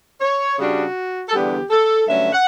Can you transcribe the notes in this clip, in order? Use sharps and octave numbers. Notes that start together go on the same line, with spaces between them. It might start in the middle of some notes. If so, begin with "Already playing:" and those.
C#5
C#3 G3 D4 F#4
A4
E2 D3 G3 B3 D4 G4
A4
G2 D3 F#3 A3 C#4 E5
F#5